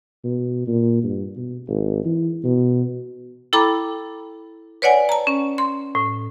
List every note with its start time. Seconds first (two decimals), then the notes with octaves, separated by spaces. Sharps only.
0.24 B2
0.67 A#2
1.03 G2
1.36 B2
1.68 G#1
2.04 E3
2.44 B2
3.53 E4 A4 G5 A#5 B5 D6
4.82 B4 C#5 D5 F#5 G#5
5.09 A5 A#5
5.27 C#4
5.58 C6
5.95 A2